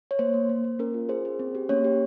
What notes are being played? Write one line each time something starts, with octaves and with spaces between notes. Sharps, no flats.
C#5
A#3 C5
A#3
A#3
A#3
C#4 A#4
F4
G#4 C5
G#4
C4
G4
A#3 C#4 C#5
G4